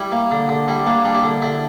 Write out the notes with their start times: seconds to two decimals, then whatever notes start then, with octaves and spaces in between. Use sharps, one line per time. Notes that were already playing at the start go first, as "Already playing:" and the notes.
Already playing: G3 E4
0.12 A#3
0.31 D3
0.49 D3
0.68 G3 E4
0.86 A#3 D4
1.05 G3 D4
1.15 E4
1.23 D3
1.42 D3 E4